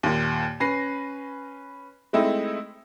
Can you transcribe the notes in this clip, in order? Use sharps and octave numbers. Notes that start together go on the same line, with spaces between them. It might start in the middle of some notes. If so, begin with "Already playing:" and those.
D#2 A#2
C#4 B4 A#6 C7
G#3 A3 C4 D#4 E4